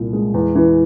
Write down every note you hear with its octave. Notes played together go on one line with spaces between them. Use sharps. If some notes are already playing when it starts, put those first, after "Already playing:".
Already playing: C2 A#2
G#3
E2
E3